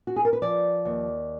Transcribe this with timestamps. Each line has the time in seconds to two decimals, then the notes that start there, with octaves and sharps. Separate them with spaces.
0.07 F#4
0.16 G#4
0.25 A#4
0.33 B4
0.42 F3 D5
0.85 D#2